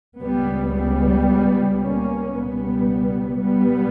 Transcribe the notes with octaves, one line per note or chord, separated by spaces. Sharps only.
C#2 C#3 G3 B3
G3 B3
A#3 C#4
C#2 B2 G3 B3
G3 B3